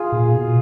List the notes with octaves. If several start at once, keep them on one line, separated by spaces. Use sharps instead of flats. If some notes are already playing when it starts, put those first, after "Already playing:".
Already playing: F4 G#4
A#2
B2